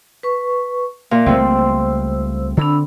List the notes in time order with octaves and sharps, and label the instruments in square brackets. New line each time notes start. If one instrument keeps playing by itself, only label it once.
[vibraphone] B4 C#6
[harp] A#2 [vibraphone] D5 E5 F5
[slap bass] C#2 G3 A3 [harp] C4 [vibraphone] C5 E6
[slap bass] D3 [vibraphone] D4 B5 E6